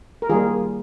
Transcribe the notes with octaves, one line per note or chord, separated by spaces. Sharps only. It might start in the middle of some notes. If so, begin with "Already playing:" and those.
A#4
D#3 G3 A#3 F4 G#4